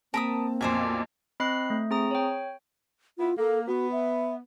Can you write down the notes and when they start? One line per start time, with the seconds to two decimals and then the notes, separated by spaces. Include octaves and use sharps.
0.14 A#3 C4 A#4 A5 B5 D#6
0.61 B1 F2 A#2 C5 D5 G#5
1.40 C4 D#5 B5 F6 F#6 C7
1.70 A3
1.91 C4 G#4 A#5 D#6
2.11 C#5 G5
3.18 B3 E4 F4
3.38 A#3 A4
3.67 B3 F#4
3.92 E5